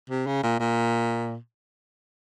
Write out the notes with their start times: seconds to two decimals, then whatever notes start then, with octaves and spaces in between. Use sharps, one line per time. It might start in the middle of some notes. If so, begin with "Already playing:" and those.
0.10 C3
0.27 C#3
0.43 A#2
0.60 A#2